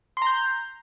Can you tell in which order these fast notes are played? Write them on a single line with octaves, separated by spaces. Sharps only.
C6 A#5 G6